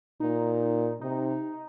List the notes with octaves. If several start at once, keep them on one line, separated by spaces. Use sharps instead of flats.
A#2 D#4
C3 D#4